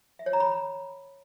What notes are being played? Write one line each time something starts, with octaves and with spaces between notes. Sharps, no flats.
E5
C#5
A#5
B5